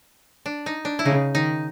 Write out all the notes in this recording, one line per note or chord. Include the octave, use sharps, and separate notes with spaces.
D4
D#4
D4
E4
C#3 D#4
D#3 D#4